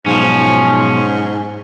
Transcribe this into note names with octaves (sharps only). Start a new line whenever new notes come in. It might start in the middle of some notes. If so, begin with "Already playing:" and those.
B1 G#2 F3 C#4